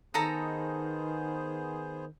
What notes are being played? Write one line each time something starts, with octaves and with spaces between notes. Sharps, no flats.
D#3 B3 D#4 G#4 A4 C5 A#5